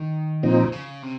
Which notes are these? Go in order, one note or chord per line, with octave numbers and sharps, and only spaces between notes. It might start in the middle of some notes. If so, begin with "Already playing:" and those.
Already playing: D#3
A#2 C#3 F3 C4 D#4
C#3
C3